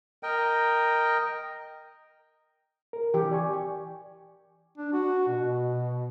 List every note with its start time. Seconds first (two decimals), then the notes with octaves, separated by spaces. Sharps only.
0.23 A#4 D#5 G5
2.93 A#4
3.14 E3 G4
3.31 D5 G#5 C#6
4.78 D4
4.93 F#4
5.28 B2